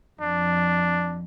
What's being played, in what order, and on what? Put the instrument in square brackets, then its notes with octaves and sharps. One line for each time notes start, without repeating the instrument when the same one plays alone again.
[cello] F2 [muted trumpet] D4